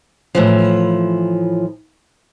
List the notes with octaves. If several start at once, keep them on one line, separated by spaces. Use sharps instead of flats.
A2 E3 F3